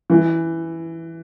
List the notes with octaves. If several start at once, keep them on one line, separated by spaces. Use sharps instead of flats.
E3